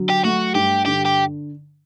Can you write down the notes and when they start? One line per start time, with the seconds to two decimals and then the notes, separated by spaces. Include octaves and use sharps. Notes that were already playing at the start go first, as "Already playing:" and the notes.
Already playing: D3 F#3
0.10 G4
0.24 A3 F#4
0.55 G2 G4
0.86 D3 G4
1.05 G4